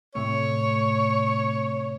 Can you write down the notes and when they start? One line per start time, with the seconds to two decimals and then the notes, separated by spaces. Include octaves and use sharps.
0.15 A2 C3 A3 C#5